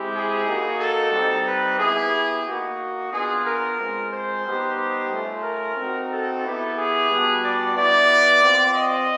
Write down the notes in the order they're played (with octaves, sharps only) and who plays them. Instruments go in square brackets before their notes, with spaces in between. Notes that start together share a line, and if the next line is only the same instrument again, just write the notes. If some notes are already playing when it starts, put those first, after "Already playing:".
Already playing: [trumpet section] G#3 C4 E4 G4
G#4
A#3 D#4 F#4
A4
G3 C4 D#4
B4
B3 E4 G4 G#4
A#3 D#4 F#4
B3 D4 F4 G#4
A#4
G#3 C4 F4
C5
G3 B3 D#4 G4
C5
A3 C#4 F4
A#4
C4 D#4 F#4
A4
B3 E4 G4
G#4
G3 B3 D4 F#4
D5
B3 E4 G4 D5
C4 F4
D#5